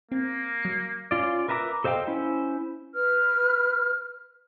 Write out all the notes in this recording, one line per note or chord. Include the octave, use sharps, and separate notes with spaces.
A#3 C4
F#3 C7 C#7
C#4 F4 D5
A#4 B4 E5 A#5 D6
A4 C5 D#5 F5 G5
C#4 E4 C5
B4 F6